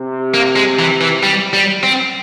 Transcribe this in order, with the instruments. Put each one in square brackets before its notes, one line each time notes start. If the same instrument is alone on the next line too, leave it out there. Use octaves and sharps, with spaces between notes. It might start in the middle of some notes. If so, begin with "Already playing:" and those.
Already playing: [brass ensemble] C3
[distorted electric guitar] A#3
G#3
E3
E3
G3
G3
C4